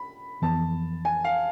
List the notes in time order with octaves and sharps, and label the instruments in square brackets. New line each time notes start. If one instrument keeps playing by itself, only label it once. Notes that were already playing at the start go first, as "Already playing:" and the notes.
Already playing: [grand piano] B5
[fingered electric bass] F2 E3 B3 [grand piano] A5
[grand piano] G#5
F5